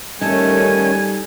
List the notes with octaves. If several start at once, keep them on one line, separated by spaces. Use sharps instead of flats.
D#3 G3 A3 C#4 D#4 A4 G#5